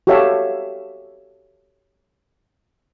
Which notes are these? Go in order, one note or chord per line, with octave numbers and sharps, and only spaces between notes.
F#4 G4 A4 C#5 E5 F5